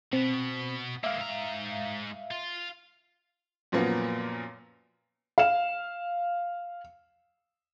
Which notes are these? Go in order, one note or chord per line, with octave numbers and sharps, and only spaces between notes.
B2 B3 C4
G#3 A#3 E5 F5
G#2 A#5
F4
F#2 A#2 F3 F#3 A#3 B3
F5 E7